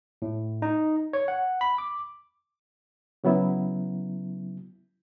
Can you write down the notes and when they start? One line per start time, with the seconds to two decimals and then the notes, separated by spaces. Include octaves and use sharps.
0.22 A2
0.62 D#4
1.13 C#5
1.28 F#5
1.61 B5
1.78 D6
3.24 C#3 F#3 B3 E4